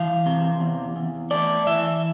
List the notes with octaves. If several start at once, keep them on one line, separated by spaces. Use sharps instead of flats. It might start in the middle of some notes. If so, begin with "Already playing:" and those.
Already playing: E3 F5
C3
E2
E2
A3 D5
E3 E5